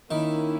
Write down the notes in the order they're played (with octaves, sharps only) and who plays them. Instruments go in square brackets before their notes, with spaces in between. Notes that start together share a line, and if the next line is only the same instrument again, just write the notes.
[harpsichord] D#3 [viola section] A#3 C#4 E4 A#4